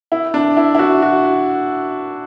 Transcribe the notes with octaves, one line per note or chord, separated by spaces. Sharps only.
E4
D4
E4
E4
F#4
F#4